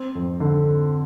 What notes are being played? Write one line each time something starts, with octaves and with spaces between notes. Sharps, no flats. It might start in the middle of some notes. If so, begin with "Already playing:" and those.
Already playing: C4
F2
D3